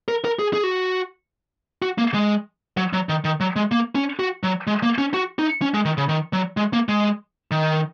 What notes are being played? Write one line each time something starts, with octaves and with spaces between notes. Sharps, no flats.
A#4
A#4
G#4
G#4
F#4
F#4
A#3
G#3
F#3
F#3
D#3
D#3
F#3
G#3
A#3
C#4
F#4
F#3
G#3
A#3
C#4
F#4
D#4
C#4
G#3
D#3
C#3
D#3
F#3
G#3
A#3
G#3
D#3